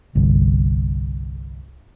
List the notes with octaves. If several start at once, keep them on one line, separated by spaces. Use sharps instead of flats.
G1 C2